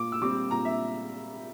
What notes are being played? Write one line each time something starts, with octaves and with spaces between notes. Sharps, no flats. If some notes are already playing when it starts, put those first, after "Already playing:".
Already playing: A#2 D6
E6
G3 C4 D6
A#2 A#5
E5